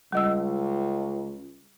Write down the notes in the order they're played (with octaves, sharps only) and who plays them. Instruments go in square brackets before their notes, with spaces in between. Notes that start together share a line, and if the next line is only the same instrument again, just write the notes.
[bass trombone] C#2 [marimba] G3 D#5 E6